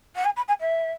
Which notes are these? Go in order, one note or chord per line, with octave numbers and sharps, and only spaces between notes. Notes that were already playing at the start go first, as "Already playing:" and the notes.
F#5
G#5
B5
G#5
E5